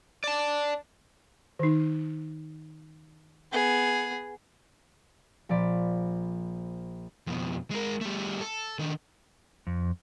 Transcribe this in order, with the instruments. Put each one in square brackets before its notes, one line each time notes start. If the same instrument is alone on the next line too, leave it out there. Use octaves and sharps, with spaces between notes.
[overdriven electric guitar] D5 A5
[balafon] D#3 D#4
[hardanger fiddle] B3 G#4
[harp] A#1 F3 D5 B5 B6
[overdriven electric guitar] F2 B2
G#3 A#4
G3 A3
A4
D#3 D4
[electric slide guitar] F2